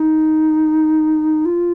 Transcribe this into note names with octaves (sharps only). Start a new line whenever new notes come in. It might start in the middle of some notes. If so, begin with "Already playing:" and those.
Already playing: D#4
F4